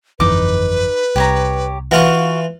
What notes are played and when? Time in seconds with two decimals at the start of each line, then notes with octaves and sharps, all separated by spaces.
0.20 G1 F2 E3 D#4 B4 D6
1.16 C2 G4 C#5 A#5
1.91 E3 F4 F#4 F5 C#6